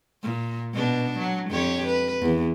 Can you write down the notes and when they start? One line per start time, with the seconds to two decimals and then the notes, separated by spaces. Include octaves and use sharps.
0.23 A#2
0.73 B2 D4
1.18 F#3
1.50 F2 G4 C#5
1.86 B4
2.21 E2